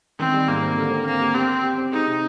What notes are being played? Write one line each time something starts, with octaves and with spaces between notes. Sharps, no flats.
D#3 C4
G3
G#2 A#3
C4
D3
C4
A#3 C4
G4
C4 G4
G4
G4
C4
G#3 D#4
C3